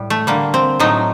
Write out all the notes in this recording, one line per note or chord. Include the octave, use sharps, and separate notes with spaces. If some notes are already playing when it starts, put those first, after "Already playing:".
Already playing: A2 G3
A3
D3 G3 A#3
C4
A2 F#3 A3 D#4